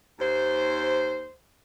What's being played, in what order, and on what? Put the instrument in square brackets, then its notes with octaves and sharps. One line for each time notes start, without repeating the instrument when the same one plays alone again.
[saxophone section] D#2 C5